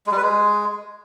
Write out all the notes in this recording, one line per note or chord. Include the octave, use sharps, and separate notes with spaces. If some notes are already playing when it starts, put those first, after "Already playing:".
G#3
G3
B4
G#3